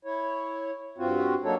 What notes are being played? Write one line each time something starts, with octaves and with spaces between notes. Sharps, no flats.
E4 C#5
G2 C4 F4 F#4
F#3 A#3 D4 D#4 A4 C#5